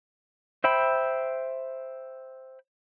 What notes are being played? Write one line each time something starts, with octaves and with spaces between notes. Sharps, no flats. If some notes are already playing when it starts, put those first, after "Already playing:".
C5 E5 G5 B5